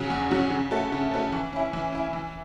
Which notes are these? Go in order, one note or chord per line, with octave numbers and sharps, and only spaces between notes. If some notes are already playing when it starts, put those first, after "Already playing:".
Already playing: C#3 F#3 C#4 F#4
E2
C#3 F#3 C#4 F#4
C#3
A3 F#4 A4
C#3
A3 F#4 A4
E3
C#4 E4
E3
C#4 E4
E3